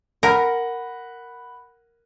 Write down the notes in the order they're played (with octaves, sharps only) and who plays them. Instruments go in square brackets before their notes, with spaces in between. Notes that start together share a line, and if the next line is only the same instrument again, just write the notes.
[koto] A#4 [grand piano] F#5 B5 A#6